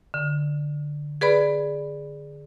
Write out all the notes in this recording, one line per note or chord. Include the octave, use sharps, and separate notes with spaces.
D3
G#4 B4 D5 B5